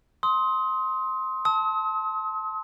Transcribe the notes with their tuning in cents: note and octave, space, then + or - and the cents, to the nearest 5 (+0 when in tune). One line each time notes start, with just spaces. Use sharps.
C6 +5 D#6 +30
A5 +0 D#6 +45